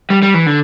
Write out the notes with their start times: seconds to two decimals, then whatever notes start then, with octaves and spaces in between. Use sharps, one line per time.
0.10 G3
0.22 G3
0.34 E3
0.46 D3